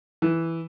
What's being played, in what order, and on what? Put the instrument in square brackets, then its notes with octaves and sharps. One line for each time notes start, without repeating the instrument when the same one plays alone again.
[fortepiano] E3